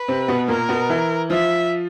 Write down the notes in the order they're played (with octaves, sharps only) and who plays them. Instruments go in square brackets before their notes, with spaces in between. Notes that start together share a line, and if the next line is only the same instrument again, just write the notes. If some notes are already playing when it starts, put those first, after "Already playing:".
Already playing: [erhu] B4
[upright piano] C3 C4
B2 B3
[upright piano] A#2 A#3 [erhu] A#4
[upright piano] B2 B3
E3 E4
[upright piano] F3 F4 [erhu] E5